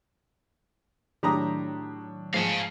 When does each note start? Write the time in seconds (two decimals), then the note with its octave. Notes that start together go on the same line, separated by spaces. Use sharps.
1.23 A2 D#3 F#3 D4 G4 C#5 A#5 D#6
2.34 G#2 F3 F5 G#5